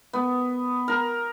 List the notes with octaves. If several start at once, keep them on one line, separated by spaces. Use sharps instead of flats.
B3
A#4